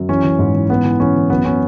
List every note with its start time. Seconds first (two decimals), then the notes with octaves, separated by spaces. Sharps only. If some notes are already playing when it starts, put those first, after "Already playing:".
Already playing: F#2
0.09 E3 C#4
0.24 E3
0.39 G#2
0.55 E3
0.70 G#2 B3
0.85 E3
1.00 E3 C#4
1.15 E3
1.30 F#2 B3
1.45 C#4